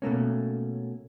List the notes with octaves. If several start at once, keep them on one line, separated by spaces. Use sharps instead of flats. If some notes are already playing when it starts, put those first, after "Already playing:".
B2 A3 A#3 C#4